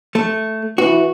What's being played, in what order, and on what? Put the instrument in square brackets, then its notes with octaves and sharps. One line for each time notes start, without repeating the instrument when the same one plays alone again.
[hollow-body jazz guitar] A3
[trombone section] E3 [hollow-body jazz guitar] F#4